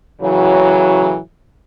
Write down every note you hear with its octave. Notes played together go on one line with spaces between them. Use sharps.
A2 C#3 E3 F#3